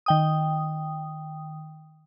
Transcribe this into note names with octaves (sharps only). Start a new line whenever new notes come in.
D#3 G5 D#6